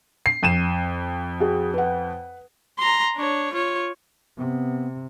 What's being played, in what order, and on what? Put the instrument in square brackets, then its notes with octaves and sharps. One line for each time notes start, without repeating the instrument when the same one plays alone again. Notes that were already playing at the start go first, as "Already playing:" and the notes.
[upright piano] C7
F2 D#7 E7
[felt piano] F#4 G#4
B4 F#5
[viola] A#5 C6
D4 C#5
F4 C#5
[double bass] C3 [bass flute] B3